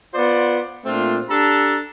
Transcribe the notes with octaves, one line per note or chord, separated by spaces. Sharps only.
B3 F4 C5 D5
A#2 A3 C4 D4 F4
D4 G4 A4 A5 A#5